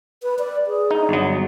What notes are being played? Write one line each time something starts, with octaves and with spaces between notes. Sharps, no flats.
B4
D5
G#4
D#4
G1 F#3